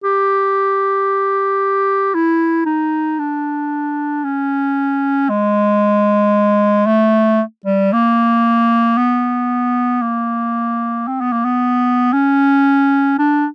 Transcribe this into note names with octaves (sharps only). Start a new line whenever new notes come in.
G4
E4
D#4
D4
C#4
G#3
A3
G3
A#3
B3
A#3
C4
B3
A#3
B3
C#4
D4